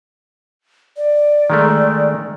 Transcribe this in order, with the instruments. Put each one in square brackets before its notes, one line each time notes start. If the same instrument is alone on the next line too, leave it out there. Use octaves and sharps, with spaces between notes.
[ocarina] D5
[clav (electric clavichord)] D#3 G#3 A3